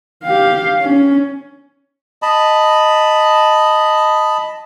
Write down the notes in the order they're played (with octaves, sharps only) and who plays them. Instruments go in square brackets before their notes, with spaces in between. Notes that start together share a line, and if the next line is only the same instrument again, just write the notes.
[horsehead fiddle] G4 F5
C#4
[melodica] D#5 A5 B5